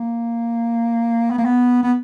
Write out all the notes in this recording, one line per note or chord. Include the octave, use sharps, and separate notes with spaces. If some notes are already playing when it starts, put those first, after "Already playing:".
Already playing: A#3
B3
A#3
B3
B3